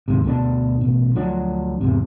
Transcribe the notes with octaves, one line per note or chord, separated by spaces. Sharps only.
D#2 G#2 C3
D2 B2 B3 D4
A1 B2
D2 F3 F#3 D4
E2 G#2 C3